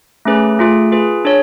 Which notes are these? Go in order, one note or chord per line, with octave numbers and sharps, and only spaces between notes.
A3 C#4 G#4 B4
A3 F4 G#4
F4 G#4 B4
D4 G#4 C#5